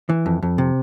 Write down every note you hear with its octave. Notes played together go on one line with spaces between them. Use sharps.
E3
F2
F2
C3